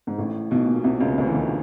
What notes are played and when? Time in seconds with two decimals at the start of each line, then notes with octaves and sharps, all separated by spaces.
0.07 G#2
0.18 A1 A2
0.51 B1 B2
0.66 A#2
0.75 B2
0.84 C2 C3
1.00 C#2 C#3
1.18 D2 D3
1.26 E3
1.34 D#2 D#3